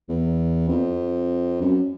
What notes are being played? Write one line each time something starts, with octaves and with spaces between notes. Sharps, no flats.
E2
F2
F#2